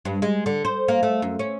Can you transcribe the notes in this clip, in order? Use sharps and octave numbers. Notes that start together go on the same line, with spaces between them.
G2
G#3
D3
C5
A#3
A3
F#2
C#4